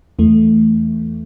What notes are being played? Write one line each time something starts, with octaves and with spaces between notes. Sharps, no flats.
E2 E3 A3